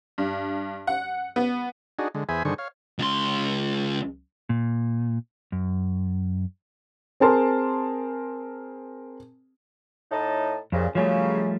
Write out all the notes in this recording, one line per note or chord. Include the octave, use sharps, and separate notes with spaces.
G2
F#5
B3
D4 D#4 F#4 G#4
D3 G#3
E2 G#4 C5 E5 G#5 B5
G2 D3 D#3 G#4 C5 C#6
C#5 F5
C#2 C6
A#2
F#2
C4 G#4 A#4 A5 C6
A2 D#4 A5
C2 F2 A#2 C#3
F#2 C#3 F3 G3 A3